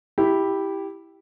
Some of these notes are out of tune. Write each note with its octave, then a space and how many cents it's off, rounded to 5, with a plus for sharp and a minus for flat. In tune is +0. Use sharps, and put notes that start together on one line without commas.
E4 -5 G4 +0